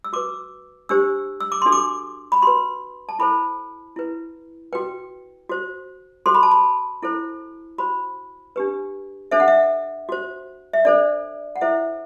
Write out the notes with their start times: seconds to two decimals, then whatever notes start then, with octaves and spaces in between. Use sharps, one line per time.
0.04 E6
0.13 F#4 B4 D6
0.89 D4 G4 C5 E6
1.40 E6
1.52 D6
1.62 D4 F#4 A4 C6
1.72 D6
2.32 B5
2.42 F#4 B4 C6
3.09 A5
3.19 E4 A4 C5 B5
3.96 E4 B4
4.73 F#4 B4 G5
5.49 F#4 C5
6.26 F#4 A4 C5 C6
6.35 B5
6.43 A5
6.51 B5
7.03 E4 A4 C5
7.78 F#4 C5 B5
8.56 D4 G4 B4
9.31 D4 A4 C5 E5
9.40 F#5
9.48 E5
10.09 F#4 C5
10.73 E5
10.85 D4 A4 C5 D5
11.56 F#5
11.61 E4 A4 C5 E5